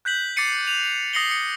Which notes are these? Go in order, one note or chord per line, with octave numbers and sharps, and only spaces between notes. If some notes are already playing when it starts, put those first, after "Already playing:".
F#6 G6 B6 F#7
D6 A6 C7 C#7 D#7
D#7 F7
F7
D#6 A#6 C7 C#7 F#7 G7
D#6 C#7